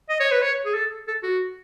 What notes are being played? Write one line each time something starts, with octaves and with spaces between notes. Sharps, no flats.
D#5
C#5
B4
C#5
G#4
A4
A4
F#4